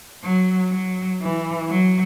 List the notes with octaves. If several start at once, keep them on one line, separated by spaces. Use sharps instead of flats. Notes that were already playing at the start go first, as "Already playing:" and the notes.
F#3
F#3
E3
F#3